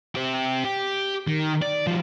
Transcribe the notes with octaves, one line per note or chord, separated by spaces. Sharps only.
C4 G4
G4
D#3
D5
F3 G3